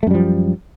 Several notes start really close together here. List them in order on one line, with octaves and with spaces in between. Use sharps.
A3 F#2 G3 F3